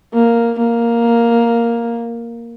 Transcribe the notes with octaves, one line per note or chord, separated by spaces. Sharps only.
A#3
A#3